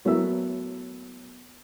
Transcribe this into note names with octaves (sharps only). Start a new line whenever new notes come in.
A2 F#3 A#3 B3 E5 E6